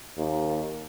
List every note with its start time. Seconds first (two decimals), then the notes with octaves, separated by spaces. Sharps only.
0.18 D#2